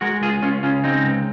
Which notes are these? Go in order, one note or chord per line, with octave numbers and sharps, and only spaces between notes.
G#3 F#4 A#4
C#2 F4 G#4
C#2 C#4 F4
C#3 C#4 F4
G#3 C4 D#4
C#2